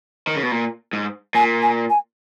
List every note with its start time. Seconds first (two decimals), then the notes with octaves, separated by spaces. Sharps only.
0.27 D#3
0.36 C#3
0.43 B2
0.52 A#2
0.93 G#2
1.35 A#2 G#5
1.62 G#5
1.90 G#5